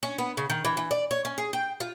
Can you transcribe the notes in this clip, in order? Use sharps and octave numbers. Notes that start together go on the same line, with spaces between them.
C#4
B3
C#3
D#3
E3
E3
D5
C#5
C#4
G#4
G5
F4